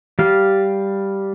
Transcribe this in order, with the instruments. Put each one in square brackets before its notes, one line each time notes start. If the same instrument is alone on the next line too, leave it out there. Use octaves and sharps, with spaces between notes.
[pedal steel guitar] G3 F5